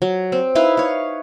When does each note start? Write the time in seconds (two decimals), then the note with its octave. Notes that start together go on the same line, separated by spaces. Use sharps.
0.02 F#3
0.32 C4
0.55 D#4 E4 B4 F5
0.77 C#5 F5